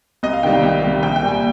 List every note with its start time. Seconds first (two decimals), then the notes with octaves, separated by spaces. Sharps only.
0.23 C2 D#5
0.33 F5
0.43 C3 D#3 G3 G5
0.53 F5
0.63 C2
0.83 C3 D#3 G3
1.02 A#1 G5
1.16 G5
1.23 A#2 G3
1.28 G#5